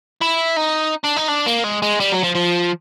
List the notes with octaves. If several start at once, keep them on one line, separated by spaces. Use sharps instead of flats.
E4
D#4
D4
D#4
D4
A#3
G#3
G#3
G3
F#3
F3
F3